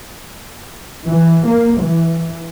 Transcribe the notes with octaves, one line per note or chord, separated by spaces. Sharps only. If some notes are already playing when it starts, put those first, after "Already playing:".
E3
A#3
E3